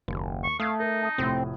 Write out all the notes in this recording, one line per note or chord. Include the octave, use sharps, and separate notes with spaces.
F#1 D#2
C#6
A3 F5 D#6 G#6
D#4 A#4
A5 D#6
F1 A2 C4